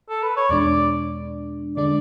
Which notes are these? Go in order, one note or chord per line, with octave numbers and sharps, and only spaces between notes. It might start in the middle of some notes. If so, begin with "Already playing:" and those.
A4
B4
C#5
E2 B2 G#3 D4 D5
D3 G#3 D4 D5